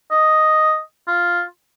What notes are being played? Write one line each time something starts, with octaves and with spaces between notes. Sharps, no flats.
D#5
F4